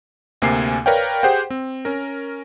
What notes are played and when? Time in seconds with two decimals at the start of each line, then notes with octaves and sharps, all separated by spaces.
0.42 D2 C3 A#3 G#5 C7
0.86 A#4 B4 C#5 D5 F5 G5
1.23 G4 G#4 C5 F#5 G5
1.50 C4
1.85 C#4 A#4